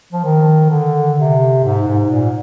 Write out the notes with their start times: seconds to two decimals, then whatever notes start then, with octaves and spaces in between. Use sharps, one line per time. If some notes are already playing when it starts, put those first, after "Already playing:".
0.13 F3
0.24 D#3
0.70 D3
1.17 C3
1.64 G#2
1.87 G#2
2.10 A#2